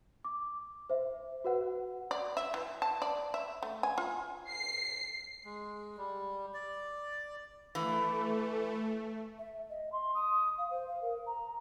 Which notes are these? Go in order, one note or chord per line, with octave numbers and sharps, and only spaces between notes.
D6
C5 E5
F#4 B4 F#5
D5
E5
E3
A5
D5
E5
A3
G#5
F4
C7
G#3
G3
D5
E3 A3
E5
D#5
C6
D#6
F5
C5
F5
A#4
A#5